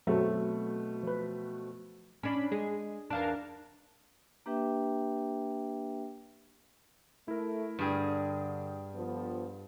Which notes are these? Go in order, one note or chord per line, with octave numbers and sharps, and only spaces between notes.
B2 F#3 A3 C4 A4
F3 B4
C#4 D4 B5
G#3 G#4
E2 D4 A#4 F5 A5
A#3 D4 G4 B4 E5 G5
A3 E4 A#4
G2 D3 G#4 G5 D#6 F6
D3 F3 B3